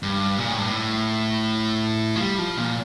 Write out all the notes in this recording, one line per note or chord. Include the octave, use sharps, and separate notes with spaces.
G2
A#2
A2
G2
A2
F3
G3
F3
A#2